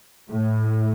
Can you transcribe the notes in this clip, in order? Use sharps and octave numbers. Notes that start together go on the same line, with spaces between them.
A2